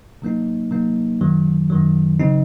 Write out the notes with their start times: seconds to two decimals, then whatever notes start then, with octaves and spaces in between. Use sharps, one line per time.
0.22 C3 F#3 A#3 D#4
0.71 C3 F#3 A#3 D#4
1.21 F#2 D#3 F#3
1.70 F#2 D#3 F#3
2.20 C#3 F#3 C4 D#4